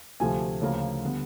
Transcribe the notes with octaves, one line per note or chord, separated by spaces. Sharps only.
D2 C3 F3 A3 G#5
D2 C#3 F3 A#3
D3 G3 B3